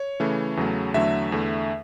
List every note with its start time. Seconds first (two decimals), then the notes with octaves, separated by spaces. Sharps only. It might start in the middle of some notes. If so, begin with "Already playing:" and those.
Already playing: C#5
0.20 C#3 E3 A3
0.57 E2 C#3 F#3 A3
0.94 E2 D3 F#3 A3 E5
1.32 E2 D3 A3